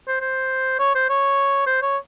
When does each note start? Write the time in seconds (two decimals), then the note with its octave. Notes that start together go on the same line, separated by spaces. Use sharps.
0.08 C5
0.21 C5
0.79 C#5
0.95 C5
1.10 C#5
1.67 C5
1.82 C#5